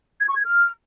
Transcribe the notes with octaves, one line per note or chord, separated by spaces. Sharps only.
G#6
C#6
G#6
F6